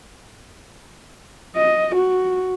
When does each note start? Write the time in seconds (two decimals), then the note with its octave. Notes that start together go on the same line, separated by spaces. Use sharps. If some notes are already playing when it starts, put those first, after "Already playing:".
1.56 D#5
1.95 F#4